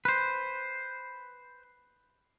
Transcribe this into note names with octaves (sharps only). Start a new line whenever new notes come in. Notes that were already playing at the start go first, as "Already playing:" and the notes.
B4 C5